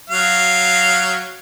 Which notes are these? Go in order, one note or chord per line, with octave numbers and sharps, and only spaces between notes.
F#3 F5